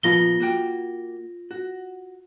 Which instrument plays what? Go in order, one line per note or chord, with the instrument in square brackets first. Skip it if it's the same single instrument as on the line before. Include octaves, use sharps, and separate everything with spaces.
[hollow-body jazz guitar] A#2 F3 B3 [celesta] F4 A#6 G7
[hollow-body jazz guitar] A#3 F#4 G5
F#4